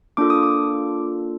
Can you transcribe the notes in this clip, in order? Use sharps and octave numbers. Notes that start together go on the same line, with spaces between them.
A#3 D4 F4 A4 D6
D#6
D6